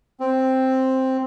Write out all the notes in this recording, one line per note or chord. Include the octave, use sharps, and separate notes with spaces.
C4